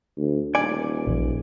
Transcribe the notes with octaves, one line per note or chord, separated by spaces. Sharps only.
D2
D#1 D5 G#5
A#1 F3